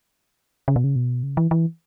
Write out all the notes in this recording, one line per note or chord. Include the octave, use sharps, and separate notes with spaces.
C#3
B2
C#3
B2
C#3
E3
E3